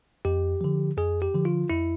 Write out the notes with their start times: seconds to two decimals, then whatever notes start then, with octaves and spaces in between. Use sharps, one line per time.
0.25 F2 G4
0.61 D3 F3
0.97 F2 G#4
1.22 G4
1.34 D3 F3
1.45 F4
1.70 F2 E4